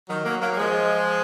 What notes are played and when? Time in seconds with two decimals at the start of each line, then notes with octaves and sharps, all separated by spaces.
0.09 D#3 F#3
0.25 F#3 A#3
0.41 F#3 A#3
0.52 A#3
0.58 F3 G#3